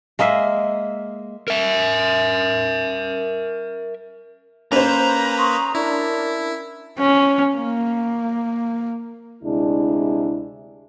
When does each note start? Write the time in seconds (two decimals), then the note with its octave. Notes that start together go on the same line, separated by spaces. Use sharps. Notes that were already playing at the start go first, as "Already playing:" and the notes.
0.19 G#3 A#3 D#5 E5
1.48 A#4 E5
4.72 A#3 C#4 B4 C5 A#5
5.37 C6 C#6 D#6
5.75 D4 E4 A#4
6.98 C#4
7.56 A#3
9.43 D2 C3 G#3 D4 E4